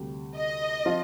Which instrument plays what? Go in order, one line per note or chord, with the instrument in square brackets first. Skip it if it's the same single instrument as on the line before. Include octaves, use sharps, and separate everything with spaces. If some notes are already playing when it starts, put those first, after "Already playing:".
Already playing: [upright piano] D2 C3 G3
[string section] D#5
[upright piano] F3 C4 F4 C5